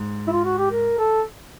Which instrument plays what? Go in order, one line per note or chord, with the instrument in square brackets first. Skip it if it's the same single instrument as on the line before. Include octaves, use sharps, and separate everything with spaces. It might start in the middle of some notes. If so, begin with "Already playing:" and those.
Already playing: [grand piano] G#2
[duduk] E4
F4
F#4
G4
A#4
A4